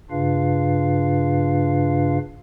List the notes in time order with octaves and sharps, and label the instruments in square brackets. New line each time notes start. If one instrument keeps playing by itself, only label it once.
[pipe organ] G2 C#3 D4 F4 B4 F5